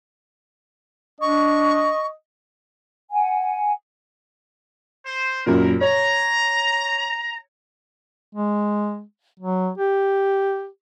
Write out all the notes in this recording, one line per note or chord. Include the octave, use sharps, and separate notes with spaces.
D4 D#5 C#6
F#5 G#5
C5
F#2 A#2 E4 A#4
C#5 A#5
G#3
F#3
G4